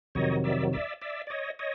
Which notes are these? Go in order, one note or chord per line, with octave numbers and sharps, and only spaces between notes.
F2 C3 D#3 F#3 C#5 D#5
D5 E5
D5 E5
D5 E5
D5
C#5 D#5
C#5 D#5